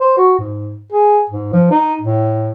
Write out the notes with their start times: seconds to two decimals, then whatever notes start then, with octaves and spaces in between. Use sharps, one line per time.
0.01 C5
0.17 F#4
0.39 G#2
0.92 G#4
1.30 G#2
1.53 F3
1.71 D#4
2.01 A2